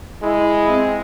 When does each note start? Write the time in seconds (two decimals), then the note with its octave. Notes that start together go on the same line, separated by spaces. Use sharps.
0.22 G#3 E4
0.68 C4